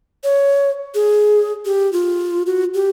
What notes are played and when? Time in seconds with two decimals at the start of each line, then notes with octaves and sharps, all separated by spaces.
0.24 C#5
0.95 G#4
1.66 G4
1.93 F4
2.46 F#4
2.74 G4